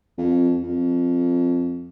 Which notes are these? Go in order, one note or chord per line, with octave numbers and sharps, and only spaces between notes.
F2
F2